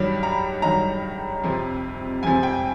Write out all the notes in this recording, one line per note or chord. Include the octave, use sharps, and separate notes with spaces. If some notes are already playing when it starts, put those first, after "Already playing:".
Already playing: G2 D#3 F#3 B5
A#5
G2 D#3 F#3 A#5
F2 C3 F3
F2 C3 F3 G#5
G5